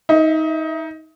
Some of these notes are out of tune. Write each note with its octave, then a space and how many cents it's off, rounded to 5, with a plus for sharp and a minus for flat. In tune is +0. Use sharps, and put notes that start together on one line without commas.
D#4 +20 E5 +0